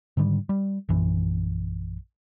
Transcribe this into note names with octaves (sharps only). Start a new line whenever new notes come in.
G#2 D3 D#3 G3
G3
A#1 F#2 E3